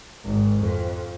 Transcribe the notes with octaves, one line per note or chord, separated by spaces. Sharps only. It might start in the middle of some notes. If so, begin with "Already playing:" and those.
G#1
F2